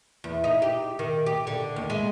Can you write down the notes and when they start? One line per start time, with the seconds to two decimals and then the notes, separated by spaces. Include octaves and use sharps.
0.24 E2
0.44 D#4
0.62 G4
0.99 D#3
1.26 G4
1.47 D3
1.76 D#2
1.90 G#3